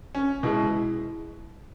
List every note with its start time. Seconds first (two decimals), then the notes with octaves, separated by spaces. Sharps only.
0.15 C#4
0.43 B2 G#3 E4